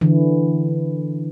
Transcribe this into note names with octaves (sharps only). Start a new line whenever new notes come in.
D3 E3